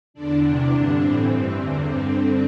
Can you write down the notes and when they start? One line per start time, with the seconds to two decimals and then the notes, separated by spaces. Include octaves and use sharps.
0.14 E2 D3 D4
0.43 E2 C3 E3
0.71 G2 D3
0.98 A2 E3 C4
1.27 G2 E3 C4
1.54 E2 D3
1.82 G2 D3 C4
2.11 G2 D3